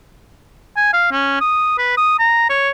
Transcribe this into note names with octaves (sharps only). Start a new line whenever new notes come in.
G#5
F5
C#4
D#6
B4
D#6
A#5
C#5